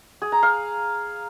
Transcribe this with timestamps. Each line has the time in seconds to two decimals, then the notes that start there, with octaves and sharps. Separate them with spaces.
0.22 G#4
0.32 A#5
0.43 F5